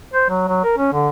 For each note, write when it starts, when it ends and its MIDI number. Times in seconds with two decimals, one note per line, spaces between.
0.13 0.27 72
0.29 0.46 54
0.48 0.59 54
0.64 0.73 70
0.77 0.91 61
0.93 1.09 50